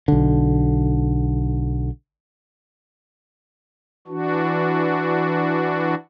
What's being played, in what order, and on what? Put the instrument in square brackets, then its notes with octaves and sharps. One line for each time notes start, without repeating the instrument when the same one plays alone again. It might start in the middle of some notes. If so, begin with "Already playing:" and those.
[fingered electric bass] B1 D3
[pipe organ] E3 D4 F#4